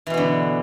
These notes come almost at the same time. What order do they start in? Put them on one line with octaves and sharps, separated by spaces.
E3 B2 B3 D3